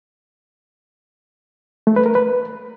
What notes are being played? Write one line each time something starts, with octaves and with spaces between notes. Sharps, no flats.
A3
B4
A#4
B4